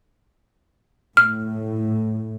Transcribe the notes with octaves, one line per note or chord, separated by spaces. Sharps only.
A2 F6